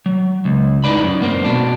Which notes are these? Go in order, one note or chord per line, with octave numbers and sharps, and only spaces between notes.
F#3
C#2
D#4 E4 B4 D5 B5
F#2
A#3 C4
B2 D4